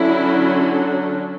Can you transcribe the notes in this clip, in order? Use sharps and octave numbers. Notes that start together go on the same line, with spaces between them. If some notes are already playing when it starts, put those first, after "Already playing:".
Already playing: D3 F#3 C#4 E4